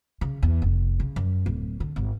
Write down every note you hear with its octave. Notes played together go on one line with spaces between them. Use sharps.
C#3
E2
F1
C#3
F#2
D1
D3
G#1